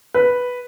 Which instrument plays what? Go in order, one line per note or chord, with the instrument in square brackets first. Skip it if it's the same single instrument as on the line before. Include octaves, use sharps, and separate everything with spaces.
[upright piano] B4